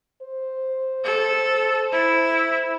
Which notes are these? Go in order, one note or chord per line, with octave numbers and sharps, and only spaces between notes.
C5
A4
E4